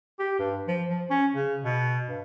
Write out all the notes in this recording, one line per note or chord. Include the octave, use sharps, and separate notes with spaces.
G4
G2
F3
F3
C#4
C#3
B2
G2